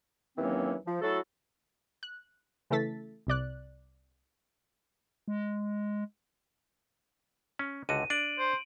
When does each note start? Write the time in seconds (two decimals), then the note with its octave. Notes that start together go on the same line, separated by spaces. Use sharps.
0.38 D#2 E3 F#3 A#3 C4 C#4
0.86 F3
1.02 F#3 A3 E4 F#4 A4
2.03 F#6
2.70 C#3 E3 A3 A4 A6 B6
3.27 C2 C3 D5 F#6
5.28 G#3
7.59 C#4
7.89 C#2 D3 F#4 D#7
8.10 D4 D7 F#7
8.39 C5